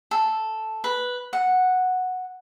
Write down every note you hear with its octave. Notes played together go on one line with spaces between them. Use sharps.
A4
B4
F#5